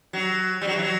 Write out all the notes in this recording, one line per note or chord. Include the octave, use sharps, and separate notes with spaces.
F#3
G3
F#3
E3
F#3